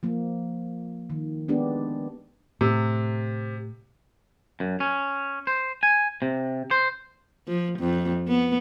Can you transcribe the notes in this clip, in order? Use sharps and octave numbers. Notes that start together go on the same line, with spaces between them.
F3 A#3
D#3
G#3 B3 D4 G4
A2 C3
F#2
C#4
C5
G#5
C3
C5
F3
F2
B3